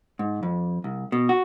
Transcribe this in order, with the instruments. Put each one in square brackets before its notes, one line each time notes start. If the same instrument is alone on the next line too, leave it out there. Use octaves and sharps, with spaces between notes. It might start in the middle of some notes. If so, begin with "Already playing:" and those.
[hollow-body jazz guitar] G#2
F2
C2
B2
F#4